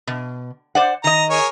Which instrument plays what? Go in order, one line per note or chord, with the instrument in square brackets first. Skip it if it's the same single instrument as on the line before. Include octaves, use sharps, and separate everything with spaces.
[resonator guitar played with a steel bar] B2
C5 D5 F#5
[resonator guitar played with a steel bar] D#3 D#5 [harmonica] A#5
[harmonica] G#4 A#4 C#5